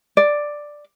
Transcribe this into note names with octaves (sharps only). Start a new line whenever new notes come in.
D5